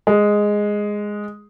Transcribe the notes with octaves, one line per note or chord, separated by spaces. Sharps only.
G#3